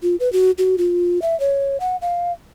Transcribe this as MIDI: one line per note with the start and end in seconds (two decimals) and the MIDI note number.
0.03 0.16 65
0.20 0.31 71
0.33 0.51 66
0.58 0.76 66
0.78 1.22 65
1.22 1.38 76
1.40 1.77 73
1.80 1.96 78
2.02 2.32 77